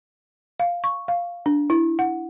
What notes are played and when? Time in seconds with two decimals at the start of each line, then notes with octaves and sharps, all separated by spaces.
0.60 F5
0.84 C#6
1.08 F5
1.46 D4
1.70 E4
1.99 F#5